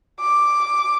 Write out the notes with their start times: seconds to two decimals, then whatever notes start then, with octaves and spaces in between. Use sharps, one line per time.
0.20 D6